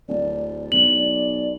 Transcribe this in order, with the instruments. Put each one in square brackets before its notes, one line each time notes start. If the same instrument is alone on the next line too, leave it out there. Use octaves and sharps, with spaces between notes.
[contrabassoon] D1 [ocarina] D5
[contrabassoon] B1 [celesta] F#7